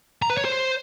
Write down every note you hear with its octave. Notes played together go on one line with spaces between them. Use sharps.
A#5
B4
C#5
C5